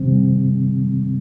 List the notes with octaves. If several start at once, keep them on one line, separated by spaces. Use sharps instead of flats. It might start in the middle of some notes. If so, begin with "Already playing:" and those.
Already playing: C3 D#3 G3 C4